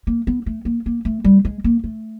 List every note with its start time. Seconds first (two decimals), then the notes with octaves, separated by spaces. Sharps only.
0.07 A#3
0.27 B3
0.46 A3
0.65 A#3
0.86 A#3
1.05 A3
1.24 G3
1.45 G#3
1.64 A#3
1.84 A3